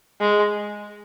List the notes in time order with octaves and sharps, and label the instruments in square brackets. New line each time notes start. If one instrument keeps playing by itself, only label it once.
[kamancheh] G#3